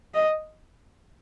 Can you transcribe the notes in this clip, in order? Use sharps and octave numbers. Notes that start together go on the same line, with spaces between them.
D#5